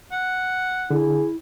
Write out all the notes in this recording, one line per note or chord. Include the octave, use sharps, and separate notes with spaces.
F#5
D3 E4 G#4